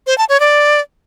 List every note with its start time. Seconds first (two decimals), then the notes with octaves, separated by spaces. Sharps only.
0.07 C5
0.18 A5
0.29 C#5
0.40 D5